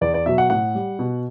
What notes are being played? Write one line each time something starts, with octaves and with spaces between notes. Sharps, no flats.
E2 D5
D5
B2 F#3 E5
F#5
A2 F#5
G3
B2